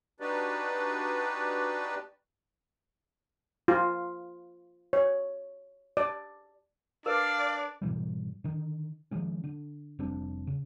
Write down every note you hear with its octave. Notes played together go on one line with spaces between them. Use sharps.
D4 D#4 F#4 G4 B4 D5
F4
C#5
D5
D4 A#4 B4 D5 F5
G#2 B2 E3 G3
D3 D#3
D#3 F3 G#3 C#4
D3
F1 G3 C4 D4
C#3